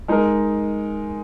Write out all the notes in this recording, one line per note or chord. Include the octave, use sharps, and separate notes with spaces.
G#3 D#4 A#4